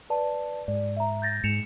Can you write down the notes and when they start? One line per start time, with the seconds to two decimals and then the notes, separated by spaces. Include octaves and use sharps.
0.10 B4 D5 A5
0.68 G#2 D5
0.97 E5 A#5
1.22 G6 A6 A#6
1.44 G#2 C#7 E7 F7